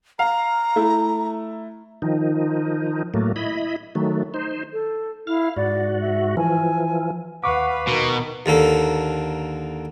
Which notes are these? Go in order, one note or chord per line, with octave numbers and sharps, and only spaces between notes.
F5 A#5
A3 E4
D#3 F3 D#4
A2 F#3 A3 A#3
E4 D#5 B5
D#3 F#3 A3
D#4 C5
A4
E4 F5
G#2 F#4 D5
E5
E3 F3 G#5
D#2 B4 F5 F#5 C#6 D6
B2 D#3 A#4
D#2 D3 A#3 A4